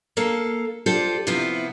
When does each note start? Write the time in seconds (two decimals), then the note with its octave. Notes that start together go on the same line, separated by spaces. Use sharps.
0.17 A#3 A4 F5
0.86 F4 G4 A4 C5 D5
1.27 C3 F3 B3 E4 F4